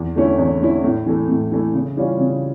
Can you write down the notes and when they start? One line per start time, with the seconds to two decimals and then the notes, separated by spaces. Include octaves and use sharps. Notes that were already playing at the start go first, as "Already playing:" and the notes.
Already playing: E2
0.15 D3 A3 C#4 E4
0.38 E2
0.60 D3 A3 C#4 E4
0.84 A2
1.06 E3 A3
1.28 A2
1.52 E3 A3
1.74 C#3
1.97 E3 G3 C#4 F4
2.19 C#3